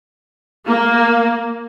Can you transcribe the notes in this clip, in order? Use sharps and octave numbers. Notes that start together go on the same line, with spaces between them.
A#3